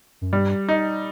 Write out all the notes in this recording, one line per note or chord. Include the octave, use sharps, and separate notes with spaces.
F#2
G2 G3
D#4